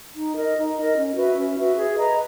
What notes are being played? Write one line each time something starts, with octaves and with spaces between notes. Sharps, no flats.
D#4
A#4 D#5
D#4
A#4 D#5
C#4
F#4 B4 E5
C#4
F#4 B4 E5
G#4
B4 D#5 A#5